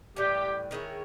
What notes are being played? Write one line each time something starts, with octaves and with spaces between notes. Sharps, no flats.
A2 E3 G3 G4
D#3 G#3 C#4 E4